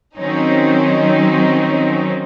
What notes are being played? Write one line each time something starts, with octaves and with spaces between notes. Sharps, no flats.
D#3 F#3 C4 C#4 D#4